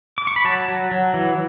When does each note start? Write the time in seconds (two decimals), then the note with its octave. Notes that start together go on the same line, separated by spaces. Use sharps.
0.18 D6
0.27 C#6
0.36 B5
0.44 F#3 A5
0.68 F#3
0.91 F#3
1.14 E3